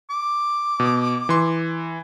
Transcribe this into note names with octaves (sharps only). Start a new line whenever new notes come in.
D6
B2
E3 C6